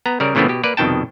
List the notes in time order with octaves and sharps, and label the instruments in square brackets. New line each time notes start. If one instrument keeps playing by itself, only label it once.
[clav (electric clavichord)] B3 A#5
C#3 G3 A#4 D5
A#2 C#3 E3 A3 B3 C4
B2 G4
A#3 B4 D5
C2 F2 B2 D#3 G5 A5